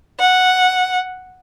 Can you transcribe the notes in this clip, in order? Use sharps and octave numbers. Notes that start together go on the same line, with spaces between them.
F#5